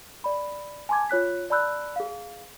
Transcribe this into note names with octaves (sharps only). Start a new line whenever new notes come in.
D5 B5
G#5 A5 C6 D6 G#6
F4 C#5 F#6 B6
D5 A5 B5 E6 F#6 G6
G#4 F5